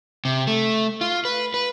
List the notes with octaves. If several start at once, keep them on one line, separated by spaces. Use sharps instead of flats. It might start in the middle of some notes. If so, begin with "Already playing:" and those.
C3
A3
F4
B4
B4